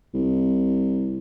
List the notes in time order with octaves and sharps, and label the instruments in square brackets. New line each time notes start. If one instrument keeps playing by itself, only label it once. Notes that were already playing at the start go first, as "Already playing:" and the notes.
[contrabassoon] C2